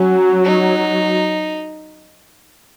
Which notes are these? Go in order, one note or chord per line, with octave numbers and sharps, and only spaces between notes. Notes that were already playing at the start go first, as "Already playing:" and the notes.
Already playing: F#3 C#4
D#4